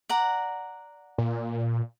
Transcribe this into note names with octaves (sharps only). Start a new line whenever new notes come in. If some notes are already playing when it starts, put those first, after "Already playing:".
D5 F#5 A#5
A#2